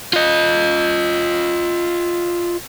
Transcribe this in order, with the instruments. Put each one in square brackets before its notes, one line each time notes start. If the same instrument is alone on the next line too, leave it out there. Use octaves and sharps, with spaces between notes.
[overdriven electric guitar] F4 D#5